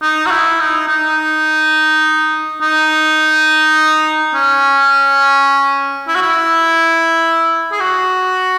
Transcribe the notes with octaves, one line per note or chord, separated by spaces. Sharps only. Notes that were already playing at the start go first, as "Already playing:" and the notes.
D#4
F#4
E4
D#4
D#4
D#4
C#4
E4
F#4
E4
G#4
F#4